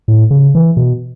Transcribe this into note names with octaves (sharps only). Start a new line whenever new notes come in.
A2
C#3
E3
B2